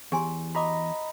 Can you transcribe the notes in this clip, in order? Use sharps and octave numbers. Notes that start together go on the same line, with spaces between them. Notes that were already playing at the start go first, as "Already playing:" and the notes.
E2 G4 G#5 C6
F#4 D#5 A#5 B5 D6